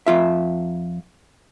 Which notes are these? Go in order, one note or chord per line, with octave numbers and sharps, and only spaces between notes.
F2 F4 E5